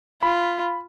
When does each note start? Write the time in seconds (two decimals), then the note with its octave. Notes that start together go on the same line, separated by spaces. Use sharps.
0.23 F4 B5